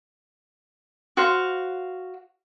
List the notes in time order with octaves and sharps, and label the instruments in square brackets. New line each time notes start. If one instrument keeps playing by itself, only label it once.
[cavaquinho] F#4 C5 F5